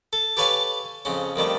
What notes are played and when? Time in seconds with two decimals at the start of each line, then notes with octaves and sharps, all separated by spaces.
0.13 A4
0.37 G4 A4 B4 C#5 F5 G#5
1.05 F2 C#3 C#4
1.36 F2 D#3 G3 A3